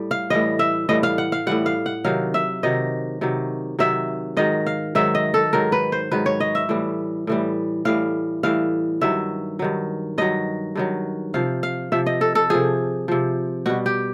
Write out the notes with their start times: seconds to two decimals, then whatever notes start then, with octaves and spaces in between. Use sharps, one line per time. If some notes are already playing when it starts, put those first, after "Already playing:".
Already playing: A2 G3
0.11 F5
0.30 A2 E3 G3 D#5
0.59 E5
0.89 A2 E3 G3 D#5
1.03 F5
1.18 F#5
1.32 F5
1.47 A2 E3 G3 F#5
1.66 F5
1.86 F#5
2.05 C3 D#3 F#3 F5
2.34 E5
2.63 C3 D#3 F#3 D#5
3.21 C3 D#3 F#3
3.79 C3 D#3 F#3 E5
4.37 G#2 D#3 F#3 D#5
4.66 F5
4.95 G#2 D#3 F#3 E5
5.15 D#5
5.34 A4
5.53 G#2 D#3 F#3 A#4
5.72 B4
5.92 C5
6.11 G#2 D#3 F#3 B4
6.26 C#5
6.40 D#5
6.55 E5
6.69 A2 E3 G3
7.27 A2 E3 G3
7.85 A2 E3 G3 F5
8.43 A2 E3 G3 F5
9.01 G2 D#3 F#3 E5
9.59 G2 D#3 F#3
10.18 G2 D#3 F#3 D#5
10.76 G2 D#3 F#3
11.34 C3 F3 F5
11.63 F5
11.92 C3 F3 E5
12.06 D#5
12.21 A4
12.35 A4
12.50 C3 F3 G#4
13.08 C3 F3
13.66 B2 G3 F#4
13.86 G4